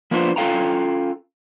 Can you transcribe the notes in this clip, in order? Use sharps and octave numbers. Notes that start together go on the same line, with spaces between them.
F3 A#3 B3 D4 F4 C5
C#4 F4 A4 F5 G5 A#5